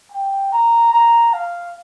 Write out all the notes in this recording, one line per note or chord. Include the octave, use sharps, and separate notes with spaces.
G5
A#5
A#5
F5